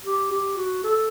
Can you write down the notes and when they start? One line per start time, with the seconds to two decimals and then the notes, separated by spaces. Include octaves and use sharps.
0.05 G4
0.31 G4
0.57 F#4
0.84 A4